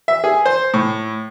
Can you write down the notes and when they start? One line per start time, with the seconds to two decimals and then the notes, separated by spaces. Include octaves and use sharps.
0.08 E5
0.24 G#4
0.46 C5
0.74 A2